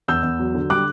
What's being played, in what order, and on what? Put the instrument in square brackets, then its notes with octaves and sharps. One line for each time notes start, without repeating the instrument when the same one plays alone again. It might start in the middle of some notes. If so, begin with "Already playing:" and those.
[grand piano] E2 E6 G6
E2
F#3
D3
G3 D6 F#6